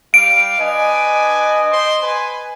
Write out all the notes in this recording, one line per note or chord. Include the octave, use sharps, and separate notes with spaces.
G3 F5 D7
D4 B4 D#5 G#5
C5 C6
B4 G#5